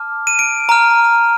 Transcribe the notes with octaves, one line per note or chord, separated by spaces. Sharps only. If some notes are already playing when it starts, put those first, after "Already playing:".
Already playing: A5 D6 F6
D#7
D7
A#5 F6